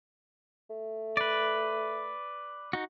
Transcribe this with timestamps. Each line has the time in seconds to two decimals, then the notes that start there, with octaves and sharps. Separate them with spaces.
0.70 A3
1.17 B4 D5
2.73 D#4 F#4